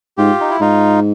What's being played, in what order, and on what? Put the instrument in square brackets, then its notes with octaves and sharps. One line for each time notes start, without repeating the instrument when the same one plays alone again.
[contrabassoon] G#2 [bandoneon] F4 G4
[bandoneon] D#4
E4
[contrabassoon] G#2 [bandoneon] D#4 F4